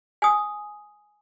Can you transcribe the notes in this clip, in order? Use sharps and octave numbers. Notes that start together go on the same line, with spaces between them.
G#5 D#6